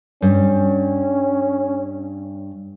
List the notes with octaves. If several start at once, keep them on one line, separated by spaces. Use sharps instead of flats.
G2 C#4